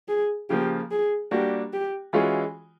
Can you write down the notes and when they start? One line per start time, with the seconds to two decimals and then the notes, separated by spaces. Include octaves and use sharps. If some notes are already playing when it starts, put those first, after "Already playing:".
0.08 G#4
0.50 C#3 F3 A#3 G4
0.91 G#4
1.31 G3 A#3 D4 F#4 G4
1.73 G4
2.13 E3 G#3 C#4 F4 F#4 G#4